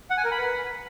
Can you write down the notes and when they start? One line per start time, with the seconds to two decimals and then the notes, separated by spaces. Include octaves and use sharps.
0.10 F#5
0.17 G#5
0.24 A#4
0.31 B5
0.38 B4